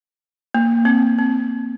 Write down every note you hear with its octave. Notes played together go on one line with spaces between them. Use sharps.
A#3
C4
C4